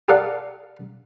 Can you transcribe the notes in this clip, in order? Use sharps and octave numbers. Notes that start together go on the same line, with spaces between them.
G4 A4 A#4 D5 F5 F#5